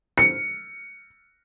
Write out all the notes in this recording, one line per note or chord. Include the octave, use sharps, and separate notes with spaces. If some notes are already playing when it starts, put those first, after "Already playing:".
C#7